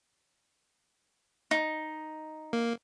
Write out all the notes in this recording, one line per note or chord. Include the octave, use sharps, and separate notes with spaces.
D#4
A#3